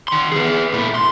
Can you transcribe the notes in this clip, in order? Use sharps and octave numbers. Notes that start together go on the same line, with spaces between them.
D#3 C6
B3 G#4
A#2 E4
C6